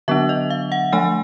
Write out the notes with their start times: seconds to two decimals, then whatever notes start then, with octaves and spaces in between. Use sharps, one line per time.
0.08 D3 F#3 B3 D4 E5
0.29 D#5
0.50 F5
0.72 F#5
0.92 F3 A3 D4 G#5